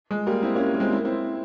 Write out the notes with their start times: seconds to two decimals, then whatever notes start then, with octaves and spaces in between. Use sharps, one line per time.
0.11 G#3
0.27 G3 A#3
0.43 C4 E4
0.55 A#3 C#4
0.74 A#3
0.80 G#3 C4
0.92 C4 E4
1.05 C4 E4